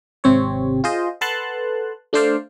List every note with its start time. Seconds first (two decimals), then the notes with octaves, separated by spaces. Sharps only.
0.24 G#1 C3 C4 C#5
0.84 F4 G#4 C5 D#5
1.21 A4 B4 F#5 A5 C6 F#6
2.13 A3 D4 A4 C5 D5 F5